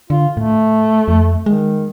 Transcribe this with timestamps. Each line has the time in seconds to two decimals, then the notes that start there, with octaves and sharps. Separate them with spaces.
0.10 D3 F4
0.37 A2 A3
1.08 F2
1.46 D#3 G#3